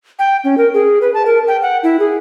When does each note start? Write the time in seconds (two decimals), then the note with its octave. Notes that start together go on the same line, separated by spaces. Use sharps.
0.19 G5
0.44 C#4
0.58 A#4
0.74 G#4
1.02 B4
1.14 A5
1.26 A#4
1.48 G5
1.62 F#5
1.83 E4
2.00 G#4